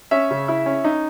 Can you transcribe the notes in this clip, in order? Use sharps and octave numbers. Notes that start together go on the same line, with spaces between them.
C#4 E5
C#3
E4
C#4
D#4